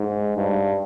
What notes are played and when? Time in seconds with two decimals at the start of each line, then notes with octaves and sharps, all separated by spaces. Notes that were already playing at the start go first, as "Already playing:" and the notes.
Already playing: G#2
0.36 G2